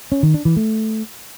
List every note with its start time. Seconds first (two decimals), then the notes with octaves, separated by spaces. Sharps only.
0.12 C#4
0.23 D#3
0.34 D4
0.45 E3
0.57 A3